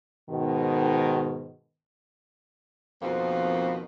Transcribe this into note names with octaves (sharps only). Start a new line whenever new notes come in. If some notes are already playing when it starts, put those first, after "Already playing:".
G#2 B2 D#3
F2 B2 D#3 F3 A#3 C4